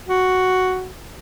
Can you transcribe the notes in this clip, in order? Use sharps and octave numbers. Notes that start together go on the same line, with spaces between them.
F#4